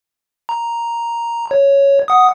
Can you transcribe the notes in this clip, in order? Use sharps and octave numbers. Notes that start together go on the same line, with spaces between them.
A#5
C#5
F#5 D#6